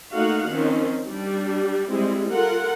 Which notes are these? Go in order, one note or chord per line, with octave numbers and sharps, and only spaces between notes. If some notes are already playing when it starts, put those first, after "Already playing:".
A3 A#3 D#4 F#4 F5 F#5
D#3 F3 C4 C#4
G3 D4
G3 G#3 C4 E4
F4 A4 A#4 F#5